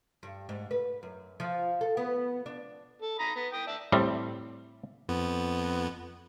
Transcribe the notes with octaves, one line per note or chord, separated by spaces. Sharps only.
G2
G#2
B4
F#2
F3
A4
B3
D4
A4
A#5 B5 D#6
B3
G5 D#6
D5 E5 A5
A2 G3 C4
F2 B3